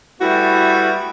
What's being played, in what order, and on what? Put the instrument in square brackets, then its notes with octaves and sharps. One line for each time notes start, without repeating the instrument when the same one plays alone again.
[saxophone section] G3 A3 B3 E4 F#4